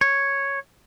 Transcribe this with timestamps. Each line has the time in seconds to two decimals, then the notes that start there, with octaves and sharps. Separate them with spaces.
0.01 C#5